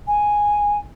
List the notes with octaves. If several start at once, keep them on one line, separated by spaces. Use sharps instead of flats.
G#5